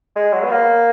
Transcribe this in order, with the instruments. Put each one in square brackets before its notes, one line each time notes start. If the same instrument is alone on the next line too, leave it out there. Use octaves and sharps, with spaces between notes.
[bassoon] G#3
F#3
B3
A#3